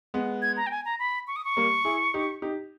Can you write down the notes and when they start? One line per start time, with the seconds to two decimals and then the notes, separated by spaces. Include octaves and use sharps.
0.14 G#3 B3
0.42 G#6
0.57 A#5
0.67 G5
0.71 G#5
0.85 A#5
0.99 B5
1.27 C#6
1.36 D#6
1.45 C#6
1.57 G3 A#3
1.85 E4 G#4
2.14 D#4 G4
2.42 D#4 G4